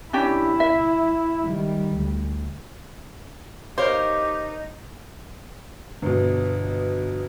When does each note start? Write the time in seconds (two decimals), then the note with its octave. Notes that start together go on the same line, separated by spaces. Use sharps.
0.13 C#4 D4 E4 G4
0.60 E5
1.45 D#3 G3
1.94 D2
3.78 D#4 G4 A#4 C5 C#5 F5
6.02 G1 B2